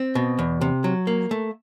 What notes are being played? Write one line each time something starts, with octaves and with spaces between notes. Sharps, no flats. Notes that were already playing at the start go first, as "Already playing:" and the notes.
Already playing: C4
B2
E2
C3
F#3
A#3
A3